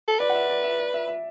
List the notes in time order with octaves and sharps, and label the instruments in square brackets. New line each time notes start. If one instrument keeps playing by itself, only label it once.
[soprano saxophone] A4
[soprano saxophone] B4 [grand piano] D5
[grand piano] F#5
E5
D5
E5
D5
E5
E5